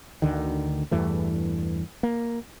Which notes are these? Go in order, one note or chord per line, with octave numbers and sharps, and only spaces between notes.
D2 D3 D#3
E2 G2 E3 A3
A#3